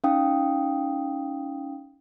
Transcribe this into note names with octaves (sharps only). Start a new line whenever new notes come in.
C#4 D#4 F5 G5 D#6